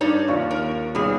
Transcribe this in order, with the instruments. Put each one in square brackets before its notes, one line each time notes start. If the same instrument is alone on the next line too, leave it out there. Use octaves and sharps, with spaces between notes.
[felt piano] G2 [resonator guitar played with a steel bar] D#4 C#5 D5
[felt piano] D#2 F4 C#6
[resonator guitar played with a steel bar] A#4
[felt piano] B1 [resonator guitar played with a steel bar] G3 G#4